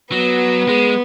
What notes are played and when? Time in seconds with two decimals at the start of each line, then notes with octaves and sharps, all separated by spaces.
0.12 F#3 B3
0.68 G#3